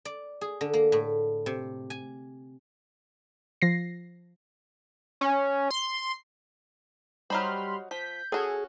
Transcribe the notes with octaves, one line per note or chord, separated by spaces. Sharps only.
D5
G#4
D3
A#3
A2
C3
G#5
F3 A#6 C7
C#4
C6
F#3 G3 D#4 C5 B5 C6 F6
F3 G6 B6
C#4 F#4 G#4 A4